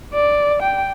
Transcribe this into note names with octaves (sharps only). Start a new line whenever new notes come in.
D5
G5